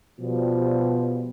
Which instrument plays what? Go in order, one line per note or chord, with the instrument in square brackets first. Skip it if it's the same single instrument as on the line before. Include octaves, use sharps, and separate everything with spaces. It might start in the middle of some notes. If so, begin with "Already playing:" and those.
[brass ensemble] B2 F3 G3